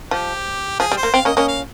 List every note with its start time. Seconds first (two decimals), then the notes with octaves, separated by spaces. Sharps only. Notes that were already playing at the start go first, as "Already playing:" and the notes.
0.11 F3 G4
0.80 F3 G#4
0.92 G3
0.97 C5
1.03 A#3
1.14 C4 F5
1.25 A#3 C#4 D#5
1.37 A#3 C#4 D#5
1.48 F5